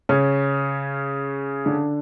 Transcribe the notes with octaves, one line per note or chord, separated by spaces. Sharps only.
C#3 C#4
D3 D4